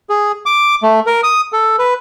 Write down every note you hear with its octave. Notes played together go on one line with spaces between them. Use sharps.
G#4
D6
A3
A#4
D#6
A4
B4